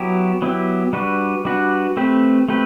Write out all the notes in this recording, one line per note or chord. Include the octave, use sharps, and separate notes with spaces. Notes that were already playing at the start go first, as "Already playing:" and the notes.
Already playing: F#3 B3 E4 G4
F#3 B3 E4 G4
G3 D4 F#4 B4
G3 D4 F#4 B4
A3 C4 G4 B4
A3 C4 G4 B4